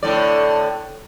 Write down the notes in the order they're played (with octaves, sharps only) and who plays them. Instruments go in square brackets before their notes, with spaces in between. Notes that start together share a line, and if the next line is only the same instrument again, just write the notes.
[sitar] A2 D3 D5